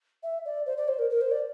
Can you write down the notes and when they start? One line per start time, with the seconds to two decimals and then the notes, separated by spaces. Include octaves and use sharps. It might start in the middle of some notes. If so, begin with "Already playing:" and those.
0.23 E5
0.45 D5
0.66 C5
0.77 D5
0.88 C5
0.99 A#4
1.10 A#4
1.21 C5
1.31 D5